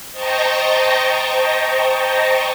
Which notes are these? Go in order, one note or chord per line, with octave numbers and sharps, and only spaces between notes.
C5 D#5 G5 A5 A#5 C#6